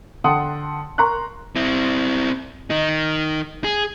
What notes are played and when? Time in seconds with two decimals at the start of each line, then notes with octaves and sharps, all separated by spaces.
0.24 D3 F#5 G5 A5 C6 D#6
0.98 A#4 A#5 C6 C#6 F#6
1.56 C4 E4
2.70 D#3 D#4
3.64 G#4